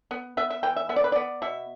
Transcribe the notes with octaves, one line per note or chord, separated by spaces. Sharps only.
B3
B3 E5
E5
E3 G5
E5
B3 E5
D5
B4
B3 D5
B2 E5